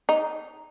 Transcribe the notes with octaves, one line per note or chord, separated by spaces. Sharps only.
D#4